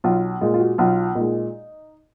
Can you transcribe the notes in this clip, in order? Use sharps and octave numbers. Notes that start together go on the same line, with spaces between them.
B1 F4
A#2 G#3 F4
F4
F#4
B1 F4
A#2 D#4
G#3